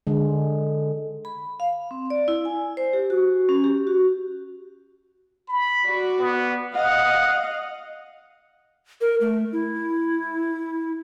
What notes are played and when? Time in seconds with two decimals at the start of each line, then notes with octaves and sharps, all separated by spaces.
0.07 D3 G#3
1.25 B5
1.60 F5
1.91 C4
2.10 D5
2.28 E4
2.45 G#5
2.77 C5
2.93 G4
3.10 F#4
3.49 C#4
3.64 G4
3.87 F#4
5.49 B5
5.83 F#4 D5
6.20 B3
6.75 D#5 F5 F#5
9.01 A#4
9.21 A3
9.52 E4